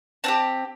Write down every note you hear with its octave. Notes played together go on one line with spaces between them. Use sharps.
C4 D#4 G4 A5